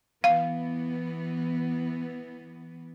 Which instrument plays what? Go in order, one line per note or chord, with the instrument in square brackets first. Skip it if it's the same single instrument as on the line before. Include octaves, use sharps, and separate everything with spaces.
[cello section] E3 B3 [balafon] F5